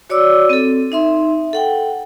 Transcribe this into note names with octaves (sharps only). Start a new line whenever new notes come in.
F#4 C#5 D5 D6 E6
C4 A4
D#4 E5 C6
A4 F#5 G5